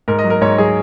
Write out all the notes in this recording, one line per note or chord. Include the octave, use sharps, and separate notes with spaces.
G#2 A#4
D#5
F#3
A#4
G#2 C#5
F#3 G#4